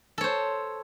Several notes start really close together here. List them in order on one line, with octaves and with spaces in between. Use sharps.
A4 C#5 C5